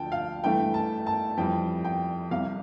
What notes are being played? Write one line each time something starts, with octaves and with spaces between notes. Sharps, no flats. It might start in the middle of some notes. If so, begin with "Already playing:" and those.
Already playing: D2 D3 F3 G5 A5
F5
G2 E3 A3 G5
A5
A5
F2 E3 G3 G5
G5
C2 C3 G3 F5